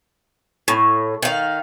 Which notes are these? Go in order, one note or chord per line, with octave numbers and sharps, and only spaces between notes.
A2
D#3 F5